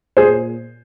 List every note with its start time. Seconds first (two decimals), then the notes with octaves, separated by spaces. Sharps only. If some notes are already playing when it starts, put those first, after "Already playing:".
0.17 A#2 G#4 C5